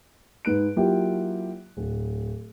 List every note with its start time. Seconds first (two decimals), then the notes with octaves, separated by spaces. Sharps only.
0.45 G#2 B4 F#6 D7
0.76 F#3 A#3 E4 F4 G4
1.77 D1